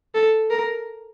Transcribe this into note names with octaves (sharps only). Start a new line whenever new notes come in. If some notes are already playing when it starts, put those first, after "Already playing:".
A4
A#4